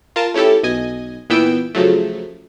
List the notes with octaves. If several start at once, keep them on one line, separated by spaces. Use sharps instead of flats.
F4 A#4 A5
A3 C#4 E4 G4 A4
B1 D#5 G#5
A#2 E3 B3 G5 E6 D7
C#3 F3 F#3 A3